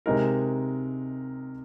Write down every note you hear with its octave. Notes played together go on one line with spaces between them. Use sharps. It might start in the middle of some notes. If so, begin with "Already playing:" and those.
C3 G#3 D#4 A#4